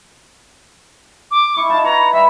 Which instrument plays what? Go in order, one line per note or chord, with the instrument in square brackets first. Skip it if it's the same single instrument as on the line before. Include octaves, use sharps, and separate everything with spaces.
[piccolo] D6
[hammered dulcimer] E4 [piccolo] C#6
[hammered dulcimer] D#4 F4 C#5 [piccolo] A5
[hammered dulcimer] B4 C#5 [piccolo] A#5
[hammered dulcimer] G3 [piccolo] E5